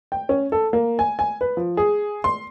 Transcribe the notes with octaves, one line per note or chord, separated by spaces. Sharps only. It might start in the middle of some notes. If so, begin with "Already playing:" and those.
G5
C#4
A4
A#3
G#5
G#5
B4
F3
G#4
C6